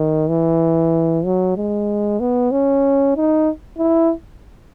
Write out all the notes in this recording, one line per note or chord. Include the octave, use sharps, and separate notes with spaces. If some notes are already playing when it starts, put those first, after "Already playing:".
Already playing: D#3
E3
F#3
G#3
B3
C#4
D#4
E4